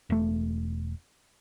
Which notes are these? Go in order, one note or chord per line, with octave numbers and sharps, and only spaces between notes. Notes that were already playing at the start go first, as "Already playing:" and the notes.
E1 A3